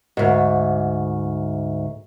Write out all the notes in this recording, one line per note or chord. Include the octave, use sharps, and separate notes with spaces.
D2 G#2